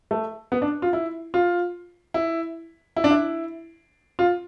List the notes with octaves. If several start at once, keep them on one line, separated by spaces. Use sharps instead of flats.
A3
B3
D4
F4
E4
F4
E4
E4
D4
E4
F4